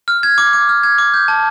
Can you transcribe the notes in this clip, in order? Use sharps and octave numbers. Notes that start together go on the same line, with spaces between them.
F6
G#6
D6
D6
F6
G#6
D6
G6
A5